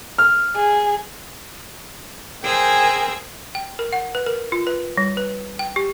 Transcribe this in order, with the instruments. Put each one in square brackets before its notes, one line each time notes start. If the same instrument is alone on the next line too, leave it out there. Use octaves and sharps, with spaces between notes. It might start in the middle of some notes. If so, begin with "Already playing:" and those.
[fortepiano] F6
[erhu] G#4
[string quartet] G#4 A#4 C5 G5 G#5 E6
[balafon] G5
A#4
F#5
B4
A#4
F4
B4
G3
B4
G5
G4